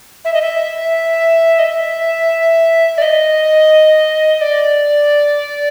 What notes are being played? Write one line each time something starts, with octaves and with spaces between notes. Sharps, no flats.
E5
D#5
E5
D#5
E5
D5
D#5
D5